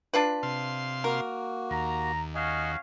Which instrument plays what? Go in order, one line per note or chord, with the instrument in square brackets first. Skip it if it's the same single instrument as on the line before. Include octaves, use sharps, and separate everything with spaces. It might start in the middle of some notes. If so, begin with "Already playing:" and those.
[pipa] D4 F4 B4
[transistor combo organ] C3 F5 C6
[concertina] A#3 F#4 [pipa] A#4
[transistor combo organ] D#2 [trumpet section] A#5
[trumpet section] C#4 F#4 F5 [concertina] D#5 G#5